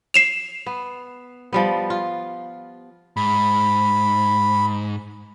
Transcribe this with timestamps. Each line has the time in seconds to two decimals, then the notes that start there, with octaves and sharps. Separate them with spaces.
0.14 C7 E7 F7
0.66 B3
1.53 F3 G3 B3
1.90 F4
3.17 G#2 B5